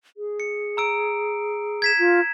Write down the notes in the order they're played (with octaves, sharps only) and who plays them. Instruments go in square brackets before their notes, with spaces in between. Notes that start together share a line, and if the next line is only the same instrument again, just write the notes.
[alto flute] G#4
[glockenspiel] C#7
A#5 E6 D7
G#6 B6 E7
[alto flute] F4